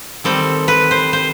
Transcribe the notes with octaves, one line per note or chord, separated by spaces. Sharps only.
D#3 G3 C4 A4
B4
C5
C5